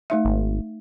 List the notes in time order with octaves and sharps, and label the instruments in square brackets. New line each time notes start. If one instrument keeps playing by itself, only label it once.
[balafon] A3 D#4 E5
[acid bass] G#1